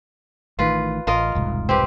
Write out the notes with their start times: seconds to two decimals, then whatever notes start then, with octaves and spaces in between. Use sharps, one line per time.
0.59 A1 A2 D#3 F4 B4
1.07 A1 F4 A#4 D#5
1.35 E1 C2 G#2
1.69 C4 G4 B4